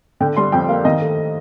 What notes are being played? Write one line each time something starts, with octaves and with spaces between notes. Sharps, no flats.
D3 G5
G3 C6
F2 G5
A#3 F5
D#3 D#5
A3